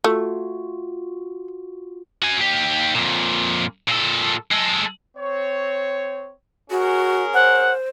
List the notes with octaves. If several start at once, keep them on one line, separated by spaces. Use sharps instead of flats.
A3 F4 F#4
F#4 G#5
D#2 G4
F2 A#2
A#2 A4
G#3 A4
C4 C#5
C#4 F#4 G#4 A#4
C5 F#5